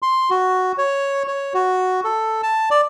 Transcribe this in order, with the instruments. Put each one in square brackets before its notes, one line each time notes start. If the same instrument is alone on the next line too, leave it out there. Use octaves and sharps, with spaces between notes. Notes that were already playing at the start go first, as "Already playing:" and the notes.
[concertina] C6
F#4
C#5
C#5
F#4
A4
A5
D5